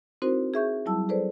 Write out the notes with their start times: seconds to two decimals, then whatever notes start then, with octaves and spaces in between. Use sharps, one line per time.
0.22 C4 D#4 E4 F#4 A#4 C5
0.54 G#4 E5 C#6 G6
0.86 F#3 G3 E4 A5 E6
1.09 G#4 A4 B4 C5 D5